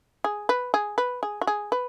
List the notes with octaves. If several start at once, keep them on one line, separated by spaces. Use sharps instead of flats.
G#4
B4
G#4
B4
G#4
F#4
G#4
B4